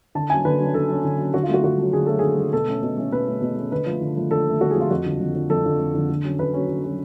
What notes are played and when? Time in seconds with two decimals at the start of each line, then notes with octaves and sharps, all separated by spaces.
0.15 D3 A5
0.29 F#3 C#4 G#5
0.45 D3 B4
0.60 F#3 C#4
0.74 D3 A4
0.89 F#3 C#4
1.04 D3
1.19 F#3 C#4
1.34 D3 F#4
1.43 F4
1.49 F#3 A3 F#4
1.64 D3 F#4
1.78 F#3 A3
1.93 D3 G#4
2.06 F#3 A3 A4
2.19 D3 G#4
2.38 F#3 A3
2.53 B2 A4
2.68 A3 C#4
2.83 B2
2.97 A3 C#4
3.12 B2 B4
3.27 A3 C#4
3.42 B2
3.57 A3 C#4
3.72 D3 B4
3.86 F3 A3
4.01 D3
4.16 F3 A3
4.31 D3 A4
4.46 F3 A3
4.61 D3 F#4
4.71 G#4
4.76 F3 A3 F4
4.90 F2 F#4
5.06 D3 F3
5.21 F2
5.35 D3 F3
5.50 F2 A4
5.65 D3 F3
5.80 F2
5.95 D3 F3
6.10 D3
6.24 F#3 C#4
6.39 D3 B4
6.53 F#3 C#4
6.69 D3
6.84 F#3 C#4